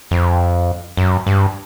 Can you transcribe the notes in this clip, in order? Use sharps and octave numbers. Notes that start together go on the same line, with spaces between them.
F2
F#2
G2